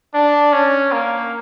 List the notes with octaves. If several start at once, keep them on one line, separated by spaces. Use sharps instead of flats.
D4
C#4
A#3